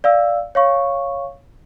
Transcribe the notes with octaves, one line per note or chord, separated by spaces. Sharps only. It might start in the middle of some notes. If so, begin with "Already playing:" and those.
D5 F5 E6
C#5 F5 C#6